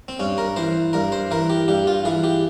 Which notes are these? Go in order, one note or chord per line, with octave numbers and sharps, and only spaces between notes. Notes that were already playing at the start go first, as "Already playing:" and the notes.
C4
G2 C#4
A#4
E3 C5
G2 A#4
C5
E3 A#4
G4
G2 G4
F4
E3 G#4
G4